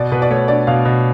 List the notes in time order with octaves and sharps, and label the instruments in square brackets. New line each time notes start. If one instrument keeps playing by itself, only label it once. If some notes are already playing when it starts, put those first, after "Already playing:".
Already playing: [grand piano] B2 D5
B2 B4
D5
A3 C#5
D4 D5
B2 F5
B2